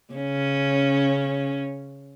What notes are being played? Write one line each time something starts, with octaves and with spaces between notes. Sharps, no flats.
C#3 C#4